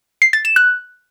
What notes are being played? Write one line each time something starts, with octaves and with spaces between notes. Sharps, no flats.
C7
A6
E7
F#6